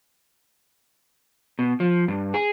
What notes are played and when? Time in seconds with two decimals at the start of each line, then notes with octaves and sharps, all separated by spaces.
1.59 B2
1.80 F3
2.08 G2
2.34 G#4